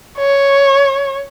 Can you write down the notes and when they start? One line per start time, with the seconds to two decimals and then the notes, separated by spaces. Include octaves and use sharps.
0.18 C#5